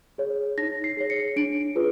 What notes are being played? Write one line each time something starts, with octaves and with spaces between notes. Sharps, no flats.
G#4 C#5
D#4 A#6
C7
G#4 C#5
C#7
D4 D7
F4 G#4 B4